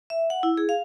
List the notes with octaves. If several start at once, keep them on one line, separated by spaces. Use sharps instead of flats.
E5
F#5
E4
G#4
F5